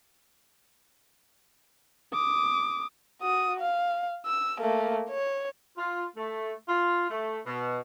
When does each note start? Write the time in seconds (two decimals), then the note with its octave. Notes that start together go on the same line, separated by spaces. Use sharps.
2.13 D6 D#6
3.21 F#4 D#6
3.60 F5
4.26 E6
4.60 A3 A#3
5.10 C#5
5.78 F4
6.17 A3
6.68 F4
7.11 A3
7.47 B2